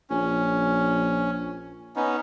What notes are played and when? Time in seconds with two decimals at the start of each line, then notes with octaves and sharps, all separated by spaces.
0.10 A#1 C#4
1.96 B3 C#4 D#4